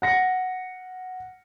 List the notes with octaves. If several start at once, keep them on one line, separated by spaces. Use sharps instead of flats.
F#5 A#6 C#7